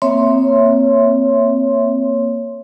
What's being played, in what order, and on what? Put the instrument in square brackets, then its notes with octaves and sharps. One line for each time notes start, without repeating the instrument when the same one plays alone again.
[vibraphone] A#3 C4 C#5 E5 C6